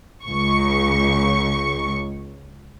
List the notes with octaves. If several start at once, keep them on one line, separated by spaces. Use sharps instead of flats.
C#2 C#6